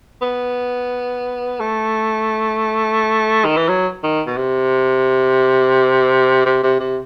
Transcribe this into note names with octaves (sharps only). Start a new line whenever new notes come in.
B3
A3
D#3
E3
F#3
D#3
B2
C3
C3
C3
C3